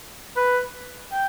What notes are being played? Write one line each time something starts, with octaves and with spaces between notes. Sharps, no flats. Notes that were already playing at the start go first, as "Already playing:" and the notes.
B4
G5